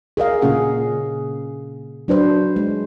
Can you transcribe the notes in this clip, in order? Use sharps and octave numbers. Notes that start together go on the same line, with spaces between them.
G#4 A#4 D#5 F5
A#2 C#3 A#3 C#4 G#4 F#5
F#3 D4 B4 C5
G#3